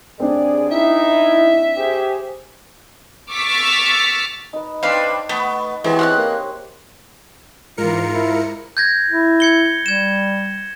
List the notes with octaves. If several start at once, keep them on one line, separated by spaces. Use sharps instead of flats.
D#2 C4 D4 G#4 D5
D#4 E4 E5
G4 G#4 C5
C#6 D6 E6 F6 A6 B6
D#4 B4
C4 D4 D#4 B4 D#5 F5
A3 B3 B4
E3 G#3 B3 C4 G4 C#5
C4 G4 C#5 F#5 F6 F#6
A#3
G#2 E3 F4 A#4 C#7
E4
G6 G#6 A#6
E4
G#6 C#7 G7
G3 G#6 E7